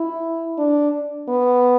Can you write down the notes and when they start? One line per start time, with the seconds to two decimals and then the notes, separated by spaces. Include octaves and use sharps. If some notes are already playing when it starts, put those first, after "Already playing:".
Already playing: E4
0.58 D4
1.29 B3